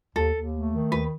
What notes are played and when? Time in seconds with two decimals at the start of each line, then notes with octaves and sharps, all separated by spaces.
0.15 D#2 A4
0.34 D#2
0.53 A3
0.72 D#3
0.92 D#2 B4